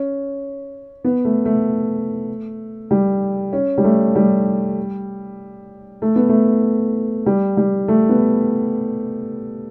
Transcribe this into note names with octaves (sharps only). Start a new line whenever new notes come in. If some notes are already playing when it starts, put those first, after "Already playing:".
Already playing: C#4
B3
A3
A3
G3
C#4
G3
A3
G3
A3
B3
A3
G3
G3
A3
B3